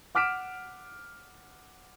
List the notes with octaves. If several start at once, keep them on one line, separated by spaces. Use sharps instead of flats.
F#5 D6 F6 B6 D7 E7